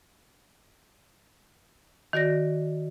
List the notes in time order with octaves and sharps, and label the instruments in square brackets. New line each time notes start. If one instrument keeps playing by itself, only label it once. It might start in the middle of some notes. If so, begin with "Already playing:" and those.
[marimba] D#3 F#4 D5 A#6